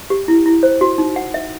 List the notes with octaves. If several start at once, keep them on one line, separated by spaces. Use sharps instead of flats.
G4
E4
E4
C5
F#4
D#4
F#5
E5